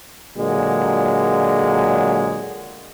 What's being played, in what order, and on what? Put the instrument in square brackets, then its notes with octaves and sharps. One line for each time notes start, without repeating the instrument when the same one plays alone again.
[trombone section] A#2 D3 F#3 G#3